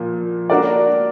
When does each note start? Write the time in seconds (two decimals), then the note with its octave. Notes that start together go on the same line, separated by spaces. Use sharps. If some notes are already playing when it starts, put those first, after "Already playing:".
Already playing: A#2 F3 A#3
0.50 A#3 D4 F#4 A#4 D5